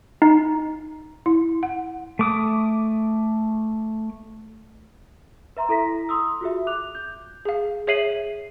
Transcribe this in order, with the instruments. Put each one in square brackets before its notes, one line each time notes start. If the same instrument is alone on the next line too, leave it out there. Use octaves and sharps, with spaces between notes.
[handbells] D#4
[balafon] E4
F#5
[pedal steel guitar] A3 D6 D#6
[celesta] B4 E5 A#5 C6
E4 A4 A#5 A#6 B6
C6 D#6 E6
F4 F#4 G#4 E5
D6 F#6 F7
G6
[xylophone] G#4 F5
G#4 C#5 E5 C7 D#7 F#7